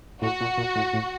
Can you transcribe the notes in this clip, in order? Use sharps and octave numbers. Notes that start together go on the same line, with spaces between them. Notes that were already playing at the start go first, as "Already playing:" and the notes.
A2 F#4
A#2
A#2
A2
A2